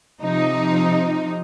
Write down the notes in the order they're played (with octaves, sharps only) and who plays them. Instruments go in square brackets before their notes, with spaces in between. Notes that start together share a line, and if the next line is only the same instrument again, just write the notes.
[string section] C3 F3 D#4